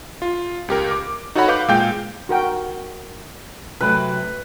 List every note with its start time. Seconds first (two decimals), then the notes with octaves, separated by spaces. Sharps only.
0.22 F4
0.68 C#2 G4 A#4
0.91 D6
1.35 D#4 F#4 A4 C#5 F#5 B5
1.48 B4 F5 F#5 D6 G6
1.68 A#2 G#3 F5 G5 G6
2.29 F#4 A#4 G5
3.81 C3 F#3 A3 B4